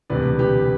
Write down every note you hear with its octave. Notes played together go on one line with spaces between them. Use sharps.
E1 D2 C3 B4 D5
G4 B4